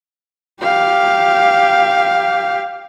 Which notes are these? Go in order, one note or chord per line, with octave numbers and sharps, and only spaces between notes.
G4 F5